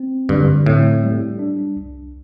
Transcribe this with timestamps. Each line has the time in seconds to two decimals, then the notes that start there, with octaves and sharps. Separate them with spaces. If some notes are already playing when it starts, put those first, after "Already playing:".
Already playing: C4
0.29 G2 D3
0.66 A2 C4
1.03 G3
1.39 D4
1.76 C2